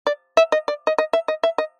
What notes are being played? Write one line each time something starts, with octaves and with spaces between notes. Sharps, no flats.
D5
E5
D#5
D5
D#5
D#5
E5
D#5
E5
D#5